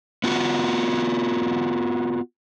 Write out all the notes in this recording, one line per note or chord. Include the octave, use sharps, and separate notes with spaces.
B3 F4 F#4